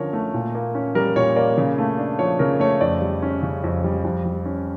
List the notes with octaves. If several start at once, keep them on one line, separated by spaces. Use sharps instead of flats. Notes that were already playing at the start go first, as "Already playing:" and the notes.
Already playing: D3 F3 C#4 A#4 C#5
A3
A#2
A#3
C#4
G3 A#4
A#2 C#5
A#3 D5
C#3
A3
D4
F3 C#5
C#3 A#4
A3 C#5
F2 D5
G3
C#4
C#3
F2
G3
F2
G3
C#4